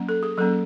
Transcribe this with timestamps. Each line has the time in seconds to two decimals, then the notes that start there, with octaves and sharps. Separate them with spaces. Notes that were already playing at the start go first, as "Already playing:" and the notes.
Already playing: F#3 A#3 C#4
0.09 A4
0.23 G#4
0.37 F#3 A#3 C#4 A4